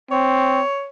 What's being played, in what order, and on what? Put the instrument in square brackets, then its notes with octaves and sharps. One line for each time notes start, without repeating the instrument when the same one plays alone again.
[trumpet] C4 [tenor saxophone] C#5